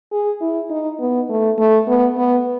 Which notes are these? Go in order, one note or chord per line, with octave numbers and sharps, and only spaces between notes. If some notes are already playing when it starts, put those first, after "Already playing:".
G#4
E4
D#4
B3
A3
A3
B3
B3